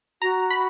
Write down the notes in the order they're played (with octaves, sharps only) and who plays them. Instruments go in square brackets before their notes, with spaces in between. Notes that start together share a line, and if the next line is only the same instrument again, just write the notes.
[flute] F#4 [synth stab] A#5
[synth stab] B5